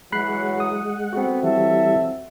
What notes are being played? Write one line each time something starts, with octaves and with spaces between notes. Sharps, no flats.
E3 F#3 G#3 F#5 B5 F#6 C7
D#6
B3 C4 F#4 A4
E3 F#3 G3 A4 E5